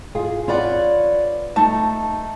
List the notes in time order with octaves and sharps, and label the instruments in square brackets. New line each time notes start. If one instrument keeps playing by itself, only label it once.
[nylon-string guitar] F4 G#4
[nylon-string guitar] F4 B4 F#5 [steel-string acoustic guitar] C#5 D5
[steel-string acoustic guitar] A3 D#4 [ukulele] A5